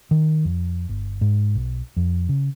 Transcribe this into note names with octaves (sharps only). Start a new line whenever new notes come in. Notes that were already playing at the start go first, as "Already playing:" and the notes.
D#3
F2
G1
G#2
B1
F2
C#3